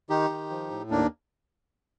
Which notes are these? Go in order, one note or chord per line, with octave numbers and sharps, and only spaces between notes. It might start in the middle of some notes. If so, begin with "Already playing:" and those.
D#3 D#4 G4
D#3
F3
A2
D#2 A#3 D4